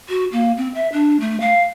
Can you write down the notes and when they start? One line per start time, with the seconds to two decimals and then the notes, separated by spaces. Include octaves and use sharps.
0.09 F#4
0.32 A#3
0.57 C4
0.75 E5
0.93 D4
1.20 A3
1.41 F5